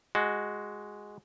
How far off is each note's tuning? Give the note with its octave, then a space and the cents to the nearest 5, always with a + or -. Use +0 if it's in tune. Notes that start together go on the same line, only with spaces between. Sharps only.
G#3 +0 F#4 +0